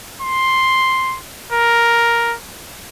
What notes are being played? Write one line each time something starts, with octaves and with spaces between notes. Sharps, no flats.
C6
A#4